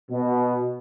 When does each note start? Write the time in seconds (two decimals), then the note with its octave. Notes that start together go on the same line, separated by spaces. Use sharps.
0.10 B2